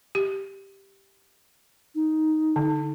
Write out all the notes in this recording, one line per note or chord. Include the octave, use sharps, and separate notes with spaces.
G4
D#4
D3